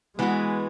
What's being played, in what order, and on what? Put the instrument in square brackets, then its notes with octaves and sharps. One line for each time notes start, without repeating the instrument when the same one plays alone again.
[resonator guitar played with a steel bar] E3 B3 F#4 [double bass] G#3